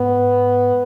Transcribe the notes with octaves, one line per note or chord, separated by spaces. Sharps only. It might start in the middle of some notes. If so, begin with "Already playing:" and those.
Already playing: G#2 B3